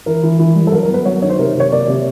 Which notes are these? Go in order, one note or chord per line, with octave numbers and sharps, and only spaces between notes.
E3 A#4
E3
E3
G3
A4
F#3 A#4
A#4
B3
B4
F#3 C#5
D#3 C#5
C5
C3 A#4
C3
C#5
A#3 D5
C3